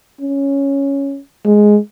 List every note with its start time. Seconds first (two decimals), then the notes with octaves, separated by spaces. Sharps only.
0.21 C#4
1.45 G#3